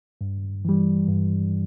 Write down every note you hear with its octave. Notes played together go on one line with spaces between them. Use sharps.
G2
E3 G3
G2